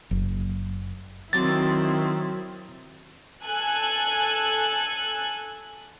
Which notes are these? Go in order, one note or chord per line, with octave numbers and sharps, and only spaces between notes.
F#1
D#3 F#3 C4 E4 A5 D6 A6
A4 G#5 F#6